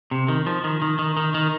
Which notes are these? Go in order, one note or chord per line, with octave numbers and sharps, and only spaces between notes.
C3
D#3
F3
D#3
D#3
D#3
D#3
D#3